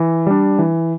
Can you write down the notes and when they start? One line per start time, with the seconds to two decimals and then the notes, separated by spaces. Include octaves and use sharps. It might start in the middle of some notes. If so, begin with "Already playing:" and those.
Already playing: E3
0.27 G3 D4
0.59 E3